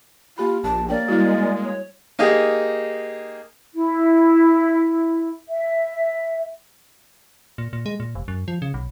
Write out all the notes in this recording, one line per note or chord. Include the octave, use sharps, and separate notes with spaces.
A#3 F4 G4 B5
A#1 A5
A#3 C#5 D5 G5
G3 G#3 E4 F#4
C#5
A#3 D#4 G4 G#4
E4
E5
A#2
A#2
G#3
A#2
F1
F#2
F3
C#3
B1